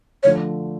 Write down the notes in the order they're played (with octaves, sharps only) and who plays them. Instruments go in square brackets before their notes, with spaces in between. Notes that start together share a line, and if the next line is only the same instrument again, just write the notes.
[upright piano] D3 F3 A3 [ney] C#5